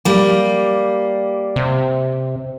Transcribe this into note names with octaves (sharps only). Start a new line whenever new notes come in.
G3 A#3
C3